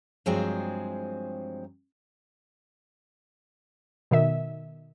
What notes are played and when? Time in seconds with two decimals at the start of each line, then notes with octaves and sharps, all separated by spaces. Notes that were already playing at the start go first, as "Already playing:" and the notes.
0.26 G2 F3 F#3 G#3 C4 G#4
4.11 B2 D#3 E5